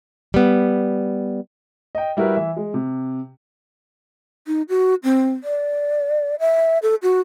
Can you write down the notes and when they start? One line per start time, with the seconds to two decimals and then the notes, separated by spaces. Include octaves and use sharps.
0.34 G3 B3
1.95 D#5 G5
2.17 G3 E4 F#4 A#4 B4
2.36 E3 E5
2.57 G#3
2.74 C3
4.47 D#4
4.69 F#4
5.04 C4
5.44 D5
6.40 E5
6.83 A4
7.03 F#4